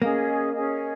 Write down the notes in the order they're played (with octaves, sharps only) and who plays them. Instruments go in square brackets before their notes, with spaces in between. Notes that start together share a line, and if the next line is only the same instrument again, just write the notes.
[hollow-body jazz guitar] A#3 [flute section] C#4 G#4 D#5
[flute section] C#4 G#4 D#5